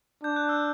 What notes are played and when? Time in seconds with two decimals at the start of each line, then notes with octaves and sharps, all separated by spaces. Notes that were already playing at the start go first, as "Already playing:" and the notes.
0.23 D4 G6
0.36 F#6
0.49 E6